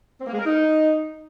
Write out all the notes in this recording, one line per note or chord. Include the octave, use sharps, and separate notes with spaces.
C4
A#3
G#3
A#4
D#4